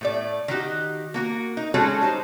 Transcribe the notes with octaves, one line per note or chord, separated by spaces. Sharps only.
A2 A3 D5
D#3 D#4 F#4 G4
A#3 F#4 A#4
D#4
G#3 A3 C#4 F#4 G#4 A4
G3 D#4 C5